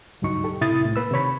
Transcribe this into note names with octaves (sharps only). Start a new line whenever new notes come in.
C#2 G2 F#3 D#4 C#6
G4 A4
A2 C3 E4 D#6 A6
C2 A2
A#3 B4 E6
C3 D#3 C#5 B5